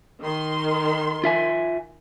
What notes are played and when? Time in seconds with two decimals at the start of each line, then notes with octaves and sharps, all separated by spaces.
0.24 D#3 C6
1.24 F4 E5 G#5